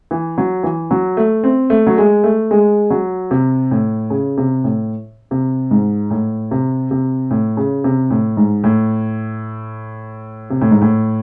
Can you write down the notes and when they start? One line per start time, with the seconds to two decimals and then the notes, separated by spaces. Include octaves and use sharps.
0.11 E3
0.38 F#3
0.63 E3
0.91 F#3
1.17 A3
1.44 C4
1.70 A3
1.87 F#3
1.98 G#3
2.24 A3
2.51 G#3
2.90 F#3
3.31 C3
3.71 A2
4.10 C#3
4.37 C3
4.64 A2
5.31 C3
5.71 G#2
6.10 A2
6.51 C3
6.91 C3
7.31 A2
7.57 C#3
7.84 C3
8.10 A2
8.37 G#2
8.64 A2
10.50 C3
10.61 A2
10.71 G#2
10.81 A2